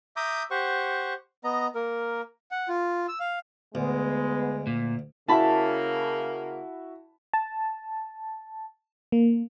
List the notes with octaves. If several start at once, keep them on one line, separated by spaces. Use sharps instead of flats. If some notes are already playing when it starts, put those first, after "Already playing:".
E5 A#5 D6 D#6 G6
G4 C5 F#5 C#6
B3 D#5 A#5
A#3 A#4
F#5
F4
E6
F5
D2 G#3 B3
A#2
C#3 A#3 E4 F#4 E5 A5 B5
A5
A#3